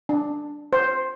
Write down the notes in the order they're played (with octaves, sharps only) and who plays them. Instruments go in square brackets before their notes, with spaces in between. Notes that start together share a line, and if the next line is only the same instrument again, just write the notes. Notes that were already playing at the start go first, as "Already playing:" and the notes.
[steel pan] D4
C5